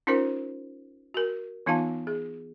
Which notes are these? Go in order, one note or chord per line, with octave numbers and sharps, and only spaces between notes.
C#4 D#4 F4 A#4 C5
F#4 A#4
E3 B3 D#4 F4 F5 A5
G#4